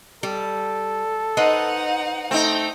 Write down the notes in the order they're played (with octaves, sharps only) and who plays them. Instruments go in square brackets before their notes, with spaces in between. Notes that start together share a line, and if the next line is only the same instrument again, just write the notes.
[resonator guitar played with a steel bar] G3 [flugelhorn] A4
[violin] D#4 F#5 [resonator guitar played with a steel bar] B4 C5 D#5
[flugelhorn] A3 [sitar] C4 D#4